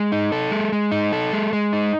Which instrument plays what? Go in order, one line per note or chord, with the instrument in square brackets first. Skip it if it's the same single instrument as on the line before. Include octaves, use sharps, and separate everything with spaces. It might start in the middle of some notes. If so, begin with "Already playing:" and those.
Already playing: [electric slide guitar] G#3
D#4
A4
G#3
G#3
D#4
A4
G#3
G#3
D#4